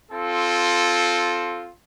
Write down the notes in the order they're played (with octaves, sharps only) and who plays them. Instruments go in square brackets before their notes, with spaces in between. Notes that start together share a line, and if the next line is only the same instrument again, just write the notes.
[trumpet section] C4 F4 A4